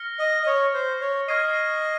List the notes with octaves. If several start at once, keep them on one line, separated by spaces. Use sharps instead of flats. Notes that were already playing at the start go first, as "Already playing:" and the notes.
Already playing: F6 A#6 C#7 G7
D#5
D#5
C#5
C5
C#5
D#5 C#6 F6 G#6 C7 D#7